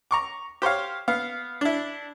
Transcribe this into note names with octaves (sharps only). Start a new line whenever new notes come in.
A#5 C#6 D6
G4 C5 C#5 F5
B3 F5
D4 E4